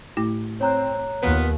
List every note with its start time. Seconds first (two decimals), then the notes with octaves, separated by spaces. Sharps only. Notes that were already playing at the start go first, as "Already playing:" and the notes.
0.17 A2 A3 E4
0.60 C4 C#5 A#5 F#6
1.23 D#2 B3 F4 B4